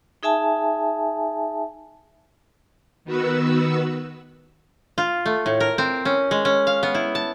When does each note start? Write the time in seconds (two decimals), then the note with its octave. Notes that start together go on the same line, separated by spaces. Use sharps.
0.23 D#4 G#4 E5 G#5 A5
3.05 D#3 B3 F#4 B4 E6
4.98 F4
5.26 A3
5.46 A2
5.60 A#4
5.78 C4
6.05 C#4
6.31 G#3
6.45 C#4
6.67 F5
6.83 B3
6.95 E4
7.15 A5